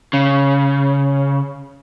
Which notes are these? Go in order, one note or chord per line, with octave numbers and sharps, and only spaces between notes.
C#3